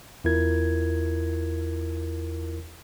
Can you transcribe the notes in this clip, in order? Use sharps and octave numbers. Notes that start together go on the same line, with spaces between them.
E2 E4 F4 A#4 G#6